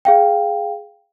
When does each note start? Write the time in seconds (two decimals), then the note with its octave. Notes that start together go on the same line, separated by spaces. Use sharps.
0.05 G#4 F5 G5